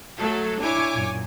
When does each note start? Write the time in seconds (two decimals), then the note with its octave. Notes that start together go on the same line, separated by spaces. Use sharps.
0.19 F#3 A3 A4
0.61 D4 E4 C#5 G#5 D6
0.93 F#2 A#2